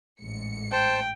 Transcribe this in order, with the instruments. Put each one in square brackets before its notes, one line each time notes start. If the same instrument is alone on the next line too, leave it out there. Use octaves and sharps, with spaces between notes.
[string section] A1 G#2 C#7
[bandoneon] C5 A5 [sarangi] G5